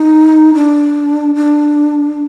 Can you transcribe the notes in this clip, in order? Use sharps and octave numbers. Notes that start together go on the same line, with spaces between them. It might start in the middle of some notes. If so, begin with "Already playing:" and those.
Already playing: D#4
D4
D4